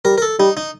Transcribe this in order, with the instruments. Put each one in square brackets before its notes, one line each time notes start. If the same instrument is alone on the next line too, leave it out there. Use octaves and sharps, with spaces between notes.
[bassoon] G3 [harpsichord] A#4
[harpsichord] A#4
A4
[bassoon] G3 [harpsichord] D#4
[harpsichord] D#4